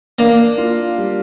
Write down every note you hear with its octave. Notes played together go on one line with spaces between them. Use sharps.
A#3 D4
F4
G3